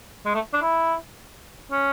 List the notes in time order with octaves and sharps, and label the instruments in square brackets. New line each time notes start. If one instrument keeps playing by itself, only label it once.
[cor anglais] G#3
A3
D4
E4
C#4